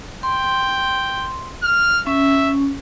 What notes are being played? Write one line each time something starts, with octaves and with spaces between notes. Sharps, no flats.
G5 C6
F6
C#4 E5